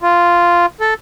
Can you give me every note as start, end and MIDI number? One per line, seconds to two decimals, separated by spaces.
0.03 0.66 65
0.80 0.94 69